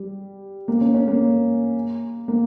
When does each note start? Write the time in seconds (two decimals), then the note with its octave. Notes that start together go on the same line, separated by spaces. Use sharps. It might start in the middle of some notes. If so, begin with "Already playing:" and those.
Already playing: G3
0.68 A#3
0.81 C#4
0.94 C#4
1.08 A#3
2.28 A#3